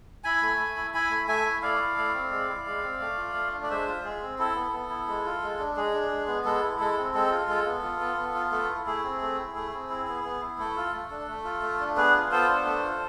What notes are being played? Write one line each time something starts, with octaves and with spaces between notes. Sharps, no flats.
E4 G#5 B5
A3
A3
E4
E4 G#5 B5
A3
A3 E5 G#5
E4
A3 D5 F5
E4
A3
C4
G#3
E4
G#3
C4
A3
F4
A3
D4
D5
G#3 C5 E5
F4
G#3 G#4
C4
E4 A4
B3
B3
E4
G#3
F4
G#3
D4
G#3 G#4
D4
G#3
B3
G#3 A4
E4
G#3 A4
C4
G#3 A4
F4
G#3 A4
B3
F4
B3
B3
F4
A3 A4
E4
A3 G#4
C4
A3
E4
A3
C4
E4
B3
B3
E4
A3 A4
F4
A3
D4
A3
F4
A3
D4
B3 G#4 B4
F4
B3 A4 C5
D4
A3
F4